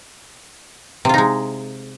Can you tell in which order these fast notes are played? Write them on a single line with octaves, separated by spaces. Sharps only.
C3 F4 D#4 G#3